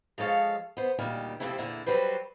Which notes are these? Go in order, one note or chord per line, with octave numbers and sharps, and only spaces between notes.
F3 G#3 A4 C#5 F5
B3 C5
D2 A#2 D#3 G3
F2 C3 A3 C4 E4
E2 A#2 D3 E4
F#3 G3 F#4 B4 C5